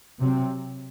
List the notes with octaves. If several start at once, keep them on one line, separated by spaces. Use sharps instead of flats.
C3 F#3 C4